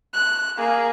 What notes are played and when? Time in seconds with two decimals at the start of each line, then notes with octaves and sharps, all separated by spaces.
0.14 F#6
0.57 A#3 G#4